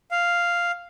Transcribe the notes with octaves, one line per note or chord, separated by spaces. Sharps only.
F5